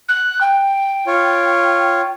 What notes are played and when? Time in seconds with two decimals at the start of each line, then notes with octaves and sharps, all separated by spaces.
0.08 F#6
0.40 G5
1.07 F4 C#5